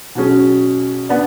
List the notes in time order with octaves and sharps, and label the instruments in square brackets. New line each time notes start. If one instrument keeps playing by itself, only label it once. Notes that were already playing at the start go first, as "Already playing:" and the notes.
[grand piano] B2 F#3 C#4 G#4
B3 D4